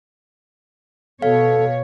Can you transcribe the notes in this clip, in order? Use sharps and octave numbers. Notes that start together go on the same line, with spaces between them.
B2 A4 C#5 F5